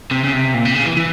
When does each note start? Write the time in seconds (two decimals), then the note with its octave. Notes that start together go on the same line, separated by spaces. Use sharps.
0.11 C3
0.24 C#3
0.33 C3
0.54 A#2
0.65 C3
0.75 C#3
0.85 E3
0.97 E3